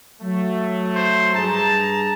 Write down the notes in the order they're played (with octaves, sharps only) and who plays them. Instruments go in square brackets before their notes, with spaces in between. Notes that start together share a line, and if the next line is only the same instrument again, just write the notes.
[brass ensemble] F#3 A3
[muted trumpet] C5
[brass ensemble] G2 G#4 A#5 [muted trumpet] A5